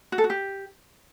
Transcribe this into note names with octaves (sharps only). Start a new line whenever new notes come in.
F#4
A4
F#4
G4